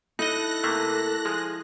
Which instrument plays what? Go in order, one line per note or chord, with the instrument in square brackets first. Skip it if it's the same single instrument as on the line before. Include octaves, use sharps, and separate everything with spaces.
[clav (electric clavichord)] D#4 D#5 [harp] E4 [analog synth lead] A4 [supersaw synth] F#6 A#6
[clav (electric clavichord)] C3 A3 A#3
[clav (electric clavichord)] F3 G#3 [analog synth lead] G#4